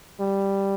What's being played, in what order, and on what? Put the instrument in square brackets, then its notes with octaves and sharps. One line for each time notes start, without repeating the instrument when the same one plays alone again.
[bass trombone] G3